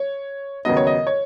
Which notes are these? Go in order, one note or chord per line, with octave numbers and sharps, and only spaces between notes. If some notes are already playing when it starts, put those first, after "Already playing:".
Already playing: C#5
D#2 C#3 F#3 B3 D#5
C#5
D#5
C#5